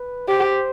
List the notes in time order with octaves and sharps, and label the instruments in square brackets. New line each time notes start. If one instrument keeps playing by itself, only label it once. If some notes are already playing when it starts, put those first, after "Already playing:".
Already playing: [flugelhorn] B4
[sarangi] G4 [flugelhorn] C5